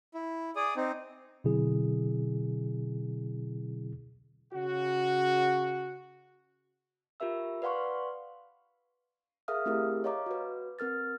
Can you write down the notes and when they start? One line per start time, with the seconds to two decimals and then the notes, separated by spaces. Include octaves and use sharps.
0.14 E4
0.56 G#4 D5 D#6
0.76 C4 D#4
1.44 B2 D3 F#3 C4 E4 G#4
4.53 C#3 F#4
7.20 F4 G4 A#4 E5 E6
7.62 B4 D5 F5 F#5 C6 C#6
9.48 G#4 A#4 E5 F5 D#6 F6
9.66 A3 C4 E4 G4 G#4 A#4
10.04 C#5 D#5 F5 A#5 D6
10.26 F#4 B4
10.79 C4 A#4 F6 A6